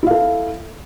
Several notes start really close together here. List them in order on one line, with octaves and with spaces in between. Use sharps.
E4 F5 A4